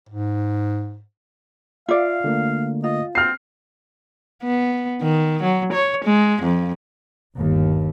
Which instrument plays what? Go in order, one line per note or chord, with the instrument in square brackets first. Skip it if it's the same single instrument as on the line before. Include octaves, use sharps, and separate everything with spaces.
[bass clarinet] G#2
[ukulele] F4 D5 [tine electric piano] E5 [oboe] F5
[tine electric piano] D3 A3 A#3
[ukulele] F4 [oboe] D#5
[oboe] C4 [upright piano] F6 C7
[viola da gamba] B3
D#3
F#3
C#5
G#3
F2
[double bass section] G1 D#2